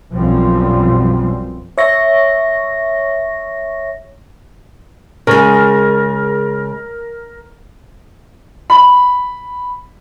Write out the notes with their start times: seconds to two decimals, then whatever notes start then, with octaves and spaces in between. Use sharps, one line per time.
0.13 B1 F#2 B2 F3 G3 C4
1.78 C#5 E5 C#6 A#6
5.27 C#3 G#3 A#4
8.70 B5